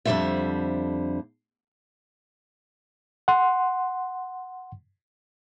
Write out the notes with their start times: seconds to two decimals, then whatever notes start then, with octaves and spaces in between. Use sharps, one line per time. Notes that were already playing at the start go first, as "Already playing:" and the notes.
0.05 F2 D3 E3 G3 C5 E5
3.28 F#5 C6